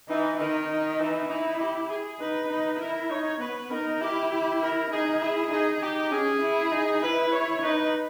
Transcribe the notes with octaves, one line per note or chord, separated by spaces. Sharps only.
E3 D#4
D#3 D#4
D#4
E3
D#4 E4
G4
G#4
D#4 B4
D#4
E4 A#4
D#4 C#5
B3 B4
D#4 A#4
E4 G4
G4
A#4
D#4 G#4
E4 G#4
D#4 G#4
D#4 G4
C#4 G#4
E4
D#4
E4 B4
C#5
D#4 B4